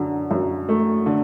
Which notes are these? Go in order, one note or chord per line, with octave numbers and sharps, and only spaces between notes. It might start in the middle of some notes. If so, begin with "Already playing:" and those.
Already playing: F#2 D3
F#2
A3
D3